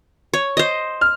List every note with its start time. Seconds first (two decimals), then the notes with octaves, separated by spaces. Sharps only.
0.33 C#5
0.57 C5 D#5
1.01 F6